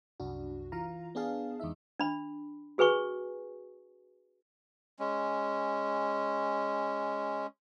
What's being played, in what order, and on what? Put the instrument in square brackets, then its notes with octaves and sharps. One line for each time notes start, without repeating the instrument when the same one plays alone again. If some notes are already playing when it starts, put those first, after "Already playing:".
[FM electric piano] C2 F#2 D4 F#4
E3 F4 F5 A#5
B3 D4 G#4 F5 A5
E2 G#3 D#4 E5
[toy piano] D4 B5
F#4 G#4 B4 G#5 C#6
[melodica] G#3 C#4